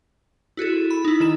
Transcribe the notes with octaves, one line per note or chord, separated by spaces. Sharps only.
E4 F#4 G#4 A4
B5
D#4 E4
D#3 A4 E7